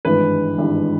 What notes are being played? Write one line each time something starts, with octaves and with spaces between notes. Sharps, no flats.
G#1 G2 E3 G#3 B4
G#1 G2 E3 G#3